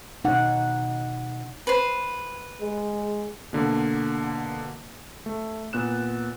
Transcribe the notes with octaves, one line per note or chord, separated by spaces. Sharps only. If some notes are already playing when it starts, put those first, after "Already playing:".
B2 D#4 F#5
B4 C5
G#3
B2 D3 A#3
A3
A#2 B3 F#6 E7